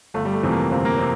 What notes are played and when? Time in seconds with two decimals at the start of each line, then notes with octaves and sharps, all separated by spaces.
0.14 G1 A3
0.25 G3
0.33 A3
0.43 F2 C3 E3
0.52 A#3
0.71 G1 C4
0.85 A#3
0.98 C3 C4